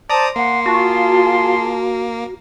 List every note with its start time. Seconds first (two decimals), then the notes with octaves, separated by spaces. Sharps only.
0.10 C5 D5 A5 A#5 D#6
0.36 A#3 F#5 C6
0.66 F4 F#4 G#4 A5